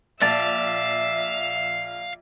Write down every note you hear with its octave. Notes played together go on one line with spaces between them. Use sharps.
A#1 D5 E5 F5 A5